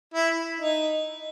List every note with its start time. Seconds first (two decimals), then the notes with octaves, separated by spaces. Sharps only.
0.14 E4
0.60 D#4